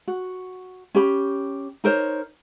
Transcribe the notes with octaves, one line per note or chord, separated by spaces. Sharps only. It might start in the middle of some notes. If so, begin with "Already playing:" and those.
F#4
C#4 G4 B5
D#4 A#4 C5 C#5